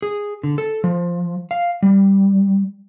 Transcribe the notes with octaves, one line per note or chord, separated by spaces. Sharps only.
G#4
D3
A4
F3
F5
G3